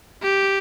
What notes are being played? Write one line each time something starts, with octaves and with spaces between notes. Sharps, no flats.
G4